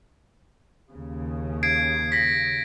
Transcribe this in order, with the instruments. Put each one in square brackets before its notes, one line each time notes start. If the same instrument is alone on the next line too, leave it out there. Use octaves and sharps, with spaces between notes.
[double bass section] D#2 C#3
[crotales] G#6 C7 D7
A#6 B6